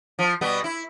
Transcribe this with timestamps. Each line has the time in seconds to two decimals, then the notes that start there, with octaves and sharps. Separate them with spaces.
0.19 F3
0.41 B2 G3 B3
0.64 E4